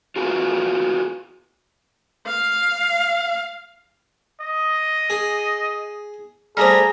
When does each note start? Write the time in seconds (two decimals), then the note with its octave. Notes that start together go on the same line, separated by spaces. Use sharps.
0.16 F4 F#4 G#4 A#4 B4 F5
2.27 F5
4.40 D#5
5.10 G#4
6.57 G3 A3 G#4 C5 A#5 F6